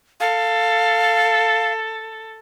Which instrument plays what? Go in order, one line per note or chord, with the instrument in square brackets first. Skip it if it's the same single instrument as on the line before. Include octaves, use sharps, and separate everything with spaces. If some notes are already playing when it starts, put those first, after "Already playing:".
[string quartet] A4 [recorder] F5